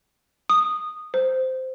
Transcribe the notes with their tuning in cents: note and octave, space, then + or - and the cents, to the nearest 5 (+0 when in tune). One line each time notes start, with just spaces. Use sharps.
D#6 -10
C5 -10